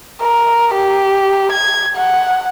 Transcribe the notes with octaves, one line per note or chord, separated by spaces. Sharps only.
A#4
G4
G#6
F#5